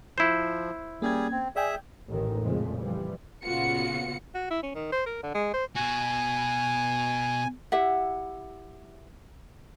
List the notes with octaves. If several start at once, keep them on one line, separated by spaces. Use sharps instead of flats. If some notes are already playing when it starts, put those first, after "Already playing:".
F3 E4 C5
G3 A#3 C#4 G#4 G#6
C4
G#4 D5 E5 G5 G#5
A1 A2 D#3
F2 A#2 C#3 F3 G#3 A3
E3 F3 G3
A#2 C#3 B3 F4 F#4 C#7
F#4
E4
C#4
D#3
C5
A#4
D3
G#3
C5
B2 F#4 G#5
E4 G4 E5 F#5